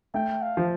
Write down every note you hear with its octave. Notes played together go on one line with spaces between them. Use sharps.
A3 G5
F5
F3